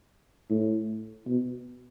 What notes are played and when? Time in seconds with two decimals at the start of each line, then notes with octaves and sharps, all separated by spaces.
0.50 A2
1.26 B2